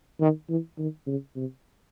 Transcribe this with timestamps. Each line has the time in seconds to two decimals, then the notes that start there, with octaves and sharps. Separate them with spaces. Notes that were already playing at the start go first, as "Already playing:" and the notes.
0.21 D#3
0.49 E3
0.78 D#3
1.07 C#3
1.36 C3